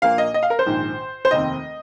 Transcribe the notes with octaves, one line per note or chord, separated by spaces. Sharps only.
A#1 A#2 A#3 F5
D#5
D#5
F5
A#4
C5
A#1 G#2 D#3
C5
F1 D#2 D#3 C4 D#5